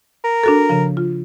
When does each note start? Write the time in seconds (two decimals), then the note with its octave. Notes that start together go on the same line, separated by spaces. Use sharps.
0.24 A#4
0.44 D4 F#4 A4
0.70 C#3 F3
0.97 F4